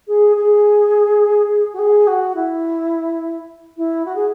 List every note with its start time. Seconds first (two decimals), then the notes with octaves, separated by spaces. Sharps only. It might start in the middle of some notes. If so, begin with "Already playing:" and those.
0.08 G#4
0.36 G#4
1.73 F#4
1.78 G#4
2.07 F#4
2.35 E4
3.77 E4
4.05 F#4
4.15 G#4